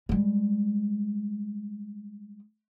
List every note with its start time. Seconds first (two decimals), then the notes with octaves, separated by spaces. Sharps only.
0.09 G3 G#3